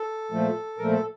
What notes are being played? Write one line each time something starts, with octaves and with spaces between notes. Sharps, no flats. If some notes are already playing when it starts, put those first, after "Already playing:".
Already playing: A4
A#2 F3 A3
A#2 F3 A3 A#4
A4